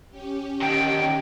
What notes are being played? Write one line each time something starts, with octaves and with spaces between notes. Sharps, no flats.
C#4 G4
D3 D#3 G5